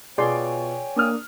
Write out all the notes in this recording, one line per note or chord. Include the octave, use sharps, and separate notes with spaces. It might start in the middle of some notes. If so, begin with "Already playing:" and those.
B2 F4 G#4 C#5 D5 G5 G#5 C6
A#3 D4 D#6 F6